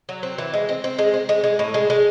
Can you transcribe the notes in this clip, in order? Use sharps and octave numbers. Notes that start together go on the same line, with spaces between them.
F#3
C4
E3
G#3
C4
C4
G#3
C4
G#3
G#3
A2
G#3
G#3